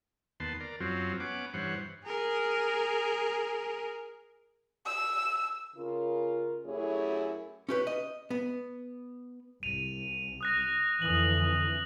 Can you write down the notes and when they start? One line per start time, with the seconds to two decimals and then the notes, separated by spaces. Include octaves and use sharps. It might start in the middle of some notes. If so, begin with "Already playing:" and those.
0.40 D#2 B3 A5 C6
0.60 A#4 D5
0.80 F#2 F#3 C4 F4
1.20 B3 C#4 F#5 D6
1.54 G2 E3 C5 C#5 F#5
2.05 G#4 A#4
4.86 E6
5.76 C#3 F4 A#4
6.65 F#2 A3 E4 G4 G#4 C#5
7.69 C#4 G4 B4
7.87 D#5
8.30 B3
9.63 C2 D#7 F7
10.41 D#6 F#6 A#6
11.02 F2 D3 E3 D#6 F#7